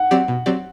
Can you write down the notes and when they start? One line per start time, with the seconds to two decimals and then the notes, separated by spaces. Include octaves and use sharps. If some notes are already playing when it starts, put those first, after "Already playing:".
Already playing: F#5
0.11 F#3 C4 G4 D5
0.28 B2
0.46 F#3 C4 G4 D5